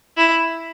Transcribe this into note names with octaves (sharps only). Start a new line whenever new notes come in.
E4